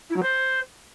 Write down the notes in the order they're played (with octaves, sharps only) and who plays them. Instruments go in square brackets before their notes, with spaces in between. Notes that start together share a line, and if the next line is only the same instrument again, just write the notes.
[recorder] E4
F#3
C5